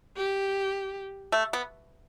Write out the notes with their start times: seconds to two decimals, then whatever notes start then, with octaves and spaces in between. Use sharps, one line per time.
0.17 G4
1.32 A3
1.53 B3